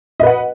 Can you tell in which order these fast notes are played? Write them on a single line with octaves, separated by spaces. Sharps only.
D#5 B4 F#5